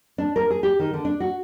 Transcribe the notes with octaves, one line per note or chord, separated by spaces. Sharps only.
D4
A#4
G#4
G4
D#3
D3
D4
F#4